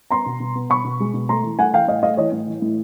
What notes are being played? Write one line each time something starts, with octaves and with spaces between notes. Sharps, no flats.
B3 A#5 C6
B2
B2
B3
B2 B5 C#6
B2
G#3
B2
A3 A#5 C6
E3
A3 F#5 G#5
E3 F5 G5
A2 D#5 F5
A3 D#5 F5
E3 C#5 D#5
A2
E3
A2